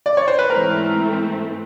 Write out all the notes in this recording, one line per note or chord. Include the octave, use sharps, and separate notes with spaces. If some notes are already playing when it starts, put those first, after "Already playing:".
D5
C#5
C5
B4
G#2 E3 A3 C4 A#4